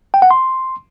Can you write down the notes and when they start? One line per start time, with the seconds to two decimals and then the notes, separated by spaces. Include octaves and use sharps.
0.14 G5
0.22 F#5
0.31 C6